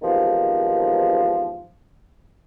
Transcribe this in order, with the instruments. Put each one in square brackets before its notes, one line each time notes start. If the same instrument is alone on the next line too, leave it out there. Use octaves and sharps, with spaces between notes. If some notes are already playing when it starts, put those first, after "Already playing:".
[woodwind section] E2 G#2 C3 D#3 F3